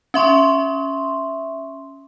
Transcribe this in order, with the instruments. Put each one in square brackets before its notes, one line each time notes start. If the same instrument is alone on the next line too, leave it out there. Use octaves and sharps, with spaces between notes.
[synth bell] C#4 E5 C6 C#6